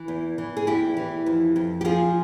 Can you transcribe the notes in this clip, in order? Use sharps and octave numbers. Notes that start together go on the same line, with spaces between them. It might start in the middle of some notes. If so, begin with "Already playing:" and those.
Already playing: E3
E2
E3
G#4
E2 E4 G4
E3
F2
F2
G4
F3 F4 G#4